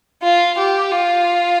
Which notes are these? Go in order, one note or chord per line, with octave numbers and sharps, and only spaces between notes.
F4
G4
F4